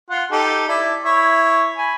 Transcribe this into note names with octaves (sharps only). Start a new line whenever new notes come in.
F4 F#5
D#4 G4 A4
E4 D5
E4 C#5
G#5 B5